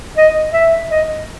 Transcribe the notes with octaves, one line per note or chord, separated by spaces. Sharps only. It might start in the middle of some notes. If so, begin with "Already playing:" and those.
D#5
E5
D#5